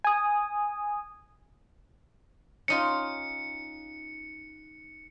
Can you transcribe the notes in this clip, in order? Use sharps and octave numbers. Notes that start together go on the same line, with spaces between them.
G#5 D#6
C#4 D#4 F4 C#7